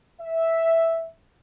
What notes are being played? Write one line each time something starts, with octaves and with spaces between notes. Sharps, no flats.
E5